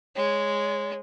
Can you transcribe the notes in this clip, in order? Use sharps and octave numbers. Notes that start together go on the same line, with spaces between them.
G#3 C#5